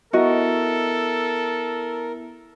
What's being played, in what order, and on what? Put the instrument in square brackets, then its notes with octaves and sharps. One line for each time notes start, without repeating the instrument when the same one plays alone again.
[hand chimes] B3 E4 E5 [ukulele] F#4 D#5 [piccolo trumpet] A4 [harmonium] A#4